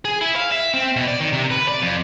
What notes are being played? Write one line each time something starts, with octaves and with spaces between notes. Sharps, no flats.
G#4
E4
F5
E5
C4
B2
D5
D#3
C3
B4
D5
F2